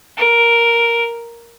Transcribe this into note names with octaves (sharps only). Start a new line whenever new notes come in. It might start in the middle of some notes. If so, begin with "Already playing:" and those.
A#4